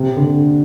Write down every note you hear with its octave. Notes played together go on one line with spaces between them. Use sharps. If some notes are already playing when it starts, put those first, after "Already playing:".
Already playing: C3
D3